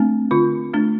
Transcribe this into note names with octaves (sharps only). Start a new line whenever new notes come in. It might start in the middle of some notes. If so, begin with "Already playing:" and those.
Already playing: A3 C4 D4
D3 F4
A3 D4